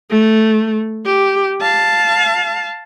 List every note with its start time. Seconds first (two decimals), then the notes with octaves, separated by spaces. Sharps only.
0.10 A3
1.05 G4
1.61 F5 A5